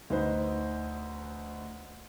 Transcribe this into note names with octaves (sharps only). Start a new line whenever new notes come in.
D2 D#4 B4 C5